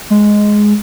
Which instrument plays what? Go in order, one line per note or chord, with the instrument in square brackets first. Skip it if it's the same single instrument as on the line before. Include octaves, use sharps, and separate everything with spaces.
[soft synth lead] G#3